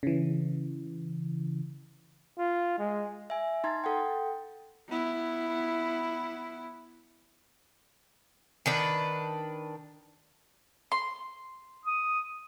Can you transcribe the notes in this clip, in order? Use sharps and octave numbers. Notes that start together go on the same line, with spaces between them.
C#3 E3
F4
G#3
E5 G#5
D#4 A#5 C6 G#6 A6
A4 F#5 G5
B3 E4
D#3 D4 B4
C6
D#6